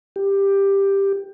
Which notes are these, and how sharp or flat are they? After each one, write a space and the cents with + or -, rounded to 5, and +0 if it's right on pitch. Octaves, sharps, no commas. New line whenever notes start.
G4 +10